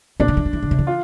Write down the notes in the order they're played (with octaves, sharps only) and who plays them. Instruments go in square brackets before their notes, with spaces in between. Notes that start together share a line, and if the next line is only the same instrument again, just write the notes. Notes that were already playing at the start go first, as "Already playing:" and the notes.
[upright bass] A#2 [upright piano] D4
[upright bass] D3
E3
F3
E3
D3
C3
E3
[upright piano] F4